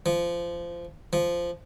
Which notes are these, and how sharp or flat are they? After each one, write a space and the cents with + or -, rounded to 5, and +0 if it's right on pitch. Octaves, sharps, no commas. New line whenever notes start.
F3 -20
F3 -10